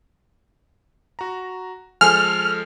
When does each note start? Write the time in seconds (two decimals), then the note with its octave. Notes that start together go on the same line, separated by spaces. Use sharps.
1.19 F#4 A#5
2.01 F3 G#3 A4 G#5 F6